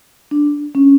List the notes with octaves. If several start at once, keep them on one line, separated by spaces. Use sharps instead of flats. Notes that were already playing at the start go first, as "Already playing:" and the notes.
D4
C#4